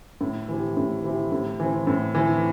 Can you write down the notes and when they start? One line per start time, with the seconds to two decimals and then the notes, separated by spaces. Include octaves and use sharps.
0.21 A2
0.48 E3 C4 E4 G4
0.77 A2
1.04 E3 C4 E4 G4
1.32 A2
1.60 E3 C4
1.87 A2
2.15 E3 C4